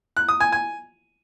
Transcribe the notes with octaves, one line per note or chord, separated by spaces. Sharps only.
F#6
D#6
G#5
G#5